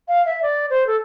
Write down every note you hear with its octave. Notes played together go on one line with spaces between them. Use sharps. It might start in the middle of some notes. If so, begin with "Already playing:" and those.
F5
E5
D5
C5
A4